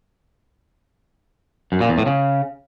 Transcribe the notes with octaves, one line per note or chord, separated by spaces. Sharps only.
F#2
A#2
E2
A2
C#3